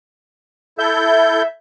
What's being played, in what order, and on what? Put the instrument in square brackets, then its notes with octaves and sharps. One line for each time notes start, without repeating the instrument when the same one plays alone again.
[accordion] E4 A4 G6 [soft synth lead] E5